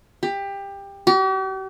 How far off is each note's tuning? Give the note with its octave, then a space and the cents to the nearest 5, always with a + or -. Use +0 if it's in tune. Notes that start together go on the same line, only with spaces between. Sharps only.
G4 +20
G4 -45